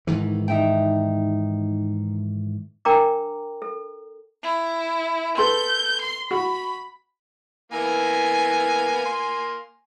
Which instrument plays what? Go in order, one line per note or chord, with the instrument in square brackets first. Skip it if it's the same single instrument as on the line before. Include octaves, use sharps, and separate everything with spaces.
[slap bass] G#2 D#3 E3
[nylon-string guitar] D#4 E5 G5
[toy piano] D4 A#4 G5 A#5 D6
A4
[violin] E4
[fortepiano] A4 B4 C6 [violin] G6
[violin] C6
[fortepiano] F#4 [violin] B5
[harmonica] E3 A#3 B3 [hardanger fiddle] G#5
[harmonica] A#3 C6